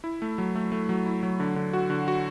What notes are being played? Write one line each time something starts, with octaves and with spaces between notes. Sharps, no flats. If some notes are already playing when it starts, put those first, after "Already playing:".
E4
A3
F#3
A3
A3
F#3
E4
F#3
D3
D3
F#4
D3
F#4